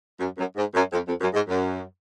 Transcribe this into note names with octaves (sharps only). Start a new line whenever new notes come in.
F#2
F#2
G#2
F#2
F2
F2
F#2
G#2
F#2